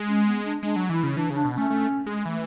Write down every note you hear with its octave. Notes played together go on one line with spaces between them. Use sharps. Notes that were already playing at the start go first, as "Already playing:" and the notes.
Already playing: G#3
C#4
B3
D4
G#3 D4
F#3
E3 E4
C#3
E3 D4
C#3 D4
B2
A3 C#4
A3
G#3
E3 A3